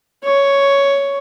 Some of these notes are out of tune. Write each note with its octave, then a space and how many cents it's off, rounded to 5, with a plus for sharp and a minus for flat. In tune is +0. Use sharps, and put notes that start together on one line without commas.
C#5 +5